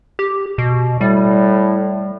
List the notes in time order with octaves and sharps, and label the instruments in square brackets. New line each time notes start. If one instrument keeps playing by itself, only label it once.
[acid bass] G4
B2
[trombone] A2 [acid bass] G3